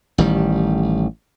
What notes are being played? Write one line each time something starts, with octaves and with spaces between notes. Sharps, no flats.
A1 D#3 G3